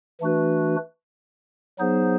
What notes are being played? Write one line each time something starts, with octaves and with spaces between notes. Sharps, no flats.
E3 A3 D4 F#4 B4
F#3 B3 D#4 G#4 C5